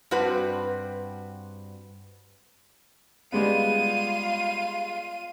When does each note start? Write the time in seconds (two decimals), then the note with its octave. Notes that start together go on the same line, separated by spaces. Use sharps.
0.11 G2 C4 F#4 B4
3.32 G3 G#3 B3 F4 D#7